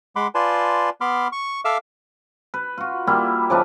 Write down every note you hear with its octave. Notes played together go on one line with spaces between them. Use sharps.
G#3 F#5 B5 C6 D6
F4 B4 D5 G#5 A5 C6
B3 B5 C6 D6 F6
C#6
A4 E5 F5 D6 E6 F6
B4
F4 F#4
G3 A#3 E4 F4
C#3 F3 D4 B4